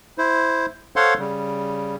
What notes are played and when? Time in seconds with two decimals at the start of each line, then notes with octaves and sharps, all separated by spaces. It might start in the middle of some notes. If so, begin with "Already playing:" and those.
0.18 E4 C5
0.96 A4 C5 C#5 F5 F#5 C6
1.19 C#3 G3